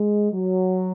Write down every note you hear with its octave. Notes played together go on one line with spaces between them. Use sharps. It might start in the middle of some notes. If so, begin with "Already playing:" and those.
Already playing: G#3
F#3